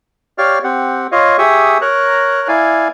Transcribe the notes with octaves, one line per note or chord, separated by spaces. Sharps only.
G4 C#5 D5 F5 F6
C4 G4 F#5
F4 C#5 D#5 F5
G4 G#4 E5 C#6 D#6
A#4 C#5 A#5 F#6
E4 D5 F5 G#5